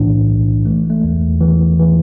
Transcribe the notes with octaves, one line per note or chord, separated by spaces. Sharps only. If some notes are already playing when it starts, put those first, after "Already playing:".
Already playing: B1 A2 E3 D4
B1
E3 A3
A3
E2
E3
E3